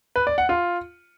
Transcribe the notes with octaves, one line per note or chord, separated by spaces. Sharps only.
B4
D5
F#5
F4